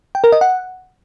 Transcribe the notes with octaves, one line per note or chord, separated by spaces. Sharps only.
G5
A#4
D#5
F#5